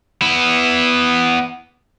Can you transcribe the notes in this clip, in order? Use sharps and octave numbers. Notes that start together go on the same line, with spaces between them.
B3 E4